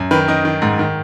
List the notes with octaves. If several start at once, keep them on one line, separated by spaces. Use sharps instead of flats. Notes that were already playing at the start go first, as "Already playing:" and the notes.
Already playing: F#2
D#3 B4
D#3 D#5
D#3
G#2
D#3